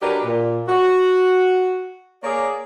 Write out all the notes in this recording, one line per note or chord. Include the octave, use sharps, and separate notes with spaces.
F#3 D4 G4 A#4 B4 D#5
A#2
F#4
A#3 G#4 C#5 D5